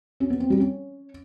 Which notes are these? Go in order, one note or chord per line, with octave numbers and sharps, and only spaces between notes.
C#4
B3
C4
G3
C#4